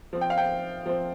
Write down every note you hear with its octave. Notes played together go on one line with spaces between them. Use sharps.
F3 C4
G5
F5
G5
F3 C4